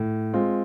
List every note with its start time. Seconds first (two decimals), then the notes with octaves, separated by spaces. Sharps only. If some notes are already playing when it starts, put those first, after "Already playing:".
Already playing: A2
0.33 G#3 C4 F4